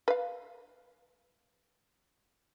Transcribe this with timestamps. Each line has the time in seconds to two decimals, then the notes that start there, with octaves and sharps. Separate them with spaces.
0.08 B4 F5